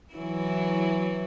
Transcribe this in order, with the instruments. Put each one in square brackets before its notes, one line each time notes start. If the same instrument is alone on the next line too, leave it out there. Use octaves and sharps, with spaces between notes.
[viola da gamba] E3 F#3 E4